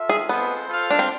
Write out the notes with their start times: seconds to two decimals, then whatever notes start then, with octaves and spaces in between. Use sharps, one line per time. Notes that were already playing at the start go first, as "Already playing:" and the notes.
Already playing: F4 A4 E5
0.09 G#4
0.28 G#3 B3 C4 F4 A4 C5
0.68 F4 A4 C5 F5
0.91 D4
0.99 C4